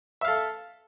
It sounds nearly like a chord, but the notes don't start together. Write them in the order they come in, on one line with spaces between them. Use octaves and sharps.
E5 F5 A4